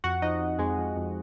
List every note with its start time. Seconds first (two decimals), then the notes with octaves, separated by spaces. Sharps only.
0.04 F2 F#4 F#5
0.22 F3 D#4 D#5
0.41 F2
0.59 F2 G#3 G#4
0.78 F3
0.96 F2